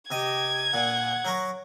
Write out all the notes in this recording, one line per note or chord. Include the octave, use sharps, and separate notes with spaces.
C3 G4 D#5 G#6
A#2 F#5
F#3 A#4 C#6